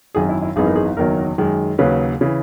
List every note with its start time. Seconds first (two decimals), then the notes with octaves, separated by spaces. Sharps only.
0.15 G#1 F#2 D#3 G#4
0.29 E4
0.42 E4
0.56 G#1 F#2 E3 B3 D#4 G#4
0.66 A#4
0.76 G#4
0.97 F#1 E2 D#3 F#3 A#4
1.38 F#2 D#3 G#3
1.78 D#2 C#3 F#3 B4
2.21 C#3 E3